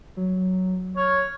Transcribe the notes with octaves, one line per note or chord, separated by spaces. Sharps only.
F#3
C#5 F6